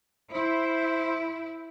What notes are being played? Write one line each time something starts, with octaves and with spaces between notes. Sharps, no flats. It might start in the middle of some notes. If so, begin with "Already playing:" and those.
E4 C5